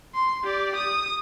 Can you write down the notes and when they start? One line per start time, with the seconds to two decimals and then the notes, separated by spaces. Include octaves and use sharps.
0.15 C6
0.44 G4 D5
0.76 D#6